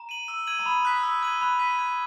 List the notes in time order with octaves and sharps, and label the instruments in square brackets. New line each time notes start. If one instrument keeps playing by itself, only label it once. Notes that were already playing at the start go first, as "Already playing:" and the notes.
Already playing: [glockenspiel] A#5
[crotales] D#7 F#7
E6
G#6 D#7 F#7
[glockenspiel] A#5
[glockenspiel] B5 [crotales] D#6
[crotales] F#6 B6
E6
G#6 D#7 F#7
[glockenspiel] B5 [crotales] F#6
[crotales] B6 D#7
G#6